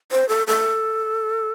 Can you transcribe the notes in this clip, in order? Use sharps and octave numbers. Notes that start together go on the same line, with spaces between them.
C5
A4
A4